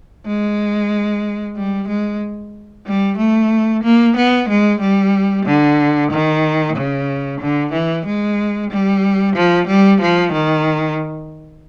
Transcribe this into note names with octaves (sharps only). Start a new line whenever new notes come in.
G#3
G3
G#3
G3
A3
A#3
B3
G#3
G3
D3
D#3
C#3
D3
E3
G#3
G3
F3
G3
F3
D#3